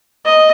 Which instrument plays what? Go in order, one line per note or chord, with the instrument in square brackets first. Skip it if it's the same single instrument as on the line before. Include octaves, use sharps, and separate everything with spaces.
[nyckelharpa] D#5